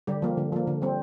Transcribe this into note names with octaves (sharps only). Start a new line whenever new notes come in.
D3 G3 G4
F3 A#3
D3
F3 A#3
D3
G3 C4